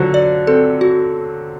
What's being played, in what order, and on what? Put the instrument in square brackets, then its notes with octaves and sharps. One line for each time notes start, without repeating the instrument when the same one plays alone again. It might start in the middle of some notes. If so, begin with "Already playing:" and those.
Already playing: [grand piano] D3 F#3 [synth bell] C5
[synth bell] D5
[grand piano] C4 [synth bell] A4
[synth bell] F#4